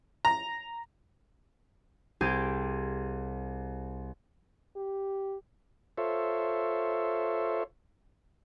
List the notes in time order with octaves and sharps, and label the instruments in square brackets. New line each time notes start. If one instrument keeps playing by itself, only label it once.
[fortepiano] A#5
[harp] C2 G4 G#4 D6 G6
[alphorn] G4
[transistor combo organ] F4 A4 C5 C#5 E5